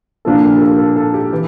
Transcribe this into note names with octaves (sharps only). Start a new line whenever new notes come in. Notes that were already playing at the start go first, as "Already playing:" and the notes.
A#2 F3 A#3 D4 A4
A#4
G4
A4
A4
A4
G4
E3